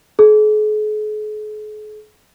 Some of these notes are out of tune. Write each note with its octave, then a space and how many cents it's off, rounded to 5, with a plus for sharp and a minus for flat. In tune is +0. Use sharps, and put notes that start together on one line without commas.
G#4 +45